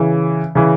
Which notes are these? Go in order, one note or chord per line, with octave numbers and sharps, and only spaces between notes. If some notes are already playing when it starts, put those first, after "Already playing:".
Already playing: C#3 E3
C#3 E3